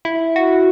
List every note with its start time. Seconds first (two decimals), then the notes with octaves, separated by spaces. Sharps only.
0.05 E4
0.36 F#4